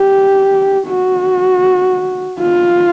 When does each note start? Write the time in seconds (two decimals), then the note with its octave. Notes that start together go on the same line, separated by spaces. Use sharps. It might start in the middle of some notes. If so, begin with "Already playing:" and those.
Already playing: G4
0.88 F#4
2.40 F4